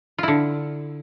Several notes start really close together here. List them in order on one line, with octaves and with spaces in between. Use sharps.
F4 E4 D3